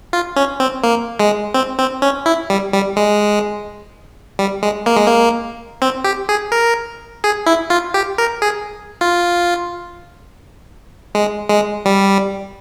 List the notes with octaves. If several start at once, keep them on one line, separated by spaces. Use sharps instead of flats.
F4
C#4
C4
A#3
G#3
C4
C4
C#4
E4
G3
G3
G#3
G3
G#3
A#3
G#3
A#3
C4
G4
G#4
A#4
G#4
E4
F4
G4
A#4
G#4
F4
G#3
G#3
G3